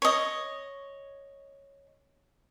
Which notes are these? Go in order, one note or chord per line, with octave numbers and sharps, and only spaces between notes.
C#5 D#5